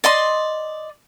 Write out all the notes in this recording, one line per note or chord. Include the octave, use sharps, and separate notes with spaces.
D5 D#5 C6